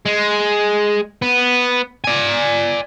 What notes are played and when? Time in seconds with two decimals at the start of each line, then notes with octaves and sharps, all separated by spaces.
0.06 G#3
1.22 B3
2.04 D5 G#5